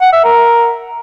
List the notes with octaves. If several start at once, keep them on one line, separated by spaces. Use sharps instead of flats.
F#5
E5
A#4